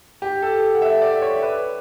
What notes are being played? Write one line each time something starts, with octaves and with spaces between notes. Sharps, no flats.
G4
A4
F#5
E5
D5
C#5
B4